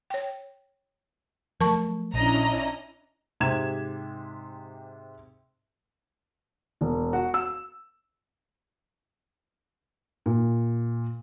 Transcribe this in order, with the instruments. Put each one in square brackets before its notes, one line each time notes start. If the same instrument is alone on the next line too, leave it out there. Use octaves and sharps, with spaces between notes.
[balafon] C#5 G5
[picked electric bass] F3 F#3 A3 [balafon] A#4 A5 C#6
[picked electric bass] A#1 [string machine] C#4 D4 E4 [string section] D#5 A#5
[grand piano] G#2 C3 G4 G#6 E7
[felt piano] E1
F#4
E6
A#2